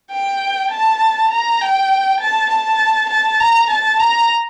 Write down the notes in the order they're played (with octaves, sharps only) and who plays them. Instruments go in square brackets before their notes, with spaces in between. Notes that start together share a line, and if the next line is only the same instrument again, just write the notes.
[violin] G5
A5
A#5
G5
A5
A5
A5
A#5
A5
A#5